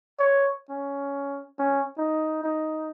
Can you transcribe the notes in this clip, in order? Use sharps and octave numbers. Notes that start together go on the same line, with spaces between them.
C#5
C#4
C#4
D#4
D#4